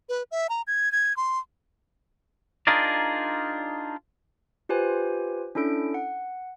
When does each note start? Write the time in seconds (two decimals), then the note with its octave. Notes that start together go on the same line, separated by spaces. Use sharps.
0.09 B4
0.31 E5
0.50 A#5
0.67 G#6
0.92 G#6
1.17 C6
2.67 D4 D#4 F4 G#4 A#4 D5
4.69 F4 G4 B4 C5 G#5
5.55 C#4 D4 E4 A4 D7
5.94 F#5